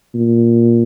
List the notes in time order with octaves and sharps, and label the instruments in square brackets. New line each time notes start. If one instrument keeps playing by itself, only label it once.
[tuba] A#2